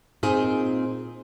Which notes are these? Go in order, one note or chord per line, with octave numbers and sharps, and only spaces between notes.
A#2 C4 D#4 G#4 C5